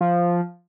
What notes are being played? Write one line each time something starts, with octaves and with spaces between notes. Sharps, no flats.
F3